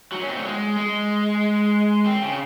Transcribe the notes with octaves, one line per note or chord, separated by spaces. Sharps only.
F#3
C#4
C4
A3
G#3
G#3
C4
C#3